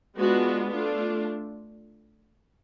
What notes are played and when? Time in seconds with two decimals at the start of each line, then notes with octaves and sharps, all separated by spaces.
0.18 G#3 B3 D4 F4 F#4
0.73 A3 D4 F4